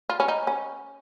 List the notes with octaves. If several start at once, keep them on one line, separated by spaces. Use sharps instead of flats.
F4
C#4
D#4
C#4